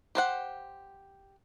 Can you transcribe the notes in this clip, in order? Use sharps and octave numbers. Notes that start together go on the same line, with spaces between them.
G4 C5 F#5